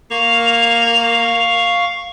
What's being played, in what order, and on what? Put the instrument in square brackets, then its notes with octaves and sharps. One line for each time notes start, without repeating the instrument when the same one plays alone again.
[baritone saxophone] A#3 [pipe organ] F5 C#6 [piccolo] F7